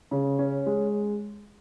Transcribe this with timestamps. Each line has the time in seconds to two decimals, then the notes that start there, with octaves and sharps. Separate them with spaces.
0.11 C#3
0.39 C#4
0.66 G#3